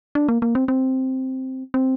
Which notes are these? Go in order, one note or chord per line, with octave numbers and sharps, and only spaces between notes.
D4
A#3
A#3
C4
C4
C4